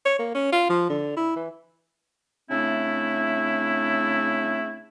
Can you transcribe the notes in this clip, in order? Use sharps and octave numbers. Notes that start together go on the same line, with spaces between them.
C#5
A#3
C#4
F4
F3
D3
E4
E3
C#3 A3 C4 D4 E4